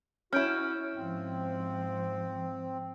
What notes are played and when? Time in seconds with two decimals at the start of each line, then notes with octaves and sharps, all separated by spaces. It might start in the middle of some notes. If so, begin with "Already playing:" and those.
0.33 C#4 E4 F#4 F6 G6 D7
0.96 G#2 F3 C4